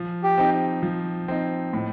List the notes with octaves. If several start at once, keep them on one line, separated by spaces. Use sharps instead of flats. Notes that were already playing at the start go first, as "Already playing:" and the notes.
Already playing: F3
G4
C4 D#4
F3
C4 D#4
A2